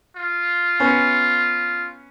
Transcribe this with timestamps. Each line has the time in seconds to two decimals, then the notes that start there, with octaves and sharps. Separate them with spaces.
0.16 F4
0.80 B3 C#4